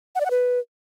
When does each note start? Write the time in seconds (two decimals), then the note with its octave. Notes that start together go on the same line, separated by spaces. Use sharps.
0.15 F#5
0.20 D5
0.26 F#5
0.31 B4